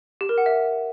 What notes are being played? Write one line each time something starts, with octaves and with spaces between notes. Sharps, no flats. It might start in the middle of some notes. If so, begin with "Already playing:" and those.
G4
A#4
F#5
E5